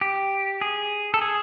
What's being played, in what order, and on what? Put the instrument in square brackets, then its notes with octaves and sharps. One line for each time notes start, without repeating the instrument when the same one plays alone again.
[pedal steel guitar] G4
G#4
A4
G#4